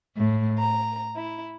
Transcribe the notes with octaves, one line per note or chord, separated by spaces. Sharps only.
A2
A#5
E4